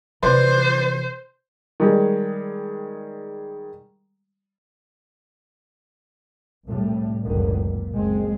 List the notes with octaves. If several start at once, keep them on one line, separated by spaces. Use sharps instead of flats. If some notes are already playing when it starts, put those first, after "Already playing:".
C3 E3 B4 C5 D5 C6
D#3 G3 G#3
C2 A2 G3
F#1 C#2 F#2 A#2 D3 D#3
A#2
F#1 G#3 C4